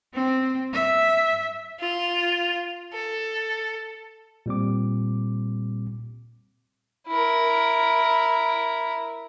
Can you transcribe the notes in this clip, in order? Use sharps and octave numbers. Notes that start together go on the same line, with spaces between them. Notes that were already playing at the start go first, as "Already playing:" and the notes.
C4
E5
F4
A4
A#2 G3 C4 D6
E4 A#4